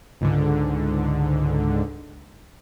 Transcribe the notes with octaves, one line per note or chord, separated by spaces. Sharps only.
C#2 G#2 D3